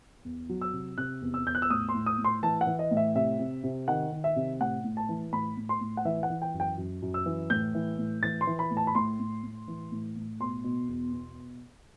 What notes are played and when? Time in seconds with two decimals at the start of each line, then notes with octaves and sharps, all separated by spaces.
0.25 E2
0.49 F#3
0.61 E6
0.73 C3
0.98 C3 F#6
1.22 E2
1.34 E6
1.46 E2 G6
1.55 F#6
1.62 E6
1.70 A2 D#6
1.89 C6
1.94 A2
2.06 D#6
2.18 A2
2.25 C6
2.43 E3 A5
2.61 F#5
2.67 E3
2.79 D#5
2.91 A2
2.97 E5
3.15 C3 E5
3.39 C3
3.64 C3
3.88 D#3 F#5
4.12 D#3
4.24 E5
4.36 C3
4.60 A2 F#5
4.84 A2
4.97 A5
5.09 E3
5.32 A2 B5
5.57 A2
5.69 C6
5.81 A2
5.97 F#5
6.05 E3 E5
6.23 F#5
6.30 E3
6.42 G5
6.54 F#2
6.60 G5
6.78 F#2
7.02 F#2
7.14 E6
7.26 E3
7.50 A2 G6
7.75 E3
7.98 A2
8.23 E3 A6
8.41 C6
8.47 E3
8.59 B5
8.71 A2
8.77 A5
8.87 B5
8.95 A2 C6
9.20 A2
9.43 A2
9.68 E3
9.92 A2
10.16 A2
10.40 B2 C6
10.64 B2
10.88 E2
11.13 B2